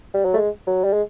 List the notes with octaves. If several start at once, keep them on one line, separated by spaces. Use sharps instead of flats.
G3
F#3
A3
G#3
F#3
G3
G#3